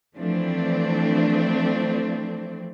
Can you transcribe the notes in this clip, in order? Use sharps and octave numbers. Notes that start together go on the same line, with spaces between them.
E3 F3 A3 C4 D4